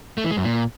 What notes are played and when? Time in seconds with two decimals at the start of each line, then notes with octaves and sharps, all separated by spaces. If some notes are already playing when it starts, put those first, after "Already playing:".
0.18 A3
0.24 E3
0.31 G#3
0.37 F#2
0.44 A#2